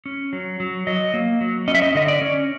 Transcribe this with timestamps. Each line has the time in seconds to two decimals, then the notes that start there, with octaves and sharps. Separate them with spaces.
0.06 C#4
0.33 F#3
0.60 F#3
0.87 F#3 D#5
1.14 A#3
1.41 F#3
1.68 C#4 D#5
1.75 E5
1.82 D#5
1.95 D3 D#5
2.08 D5
2.22 C#4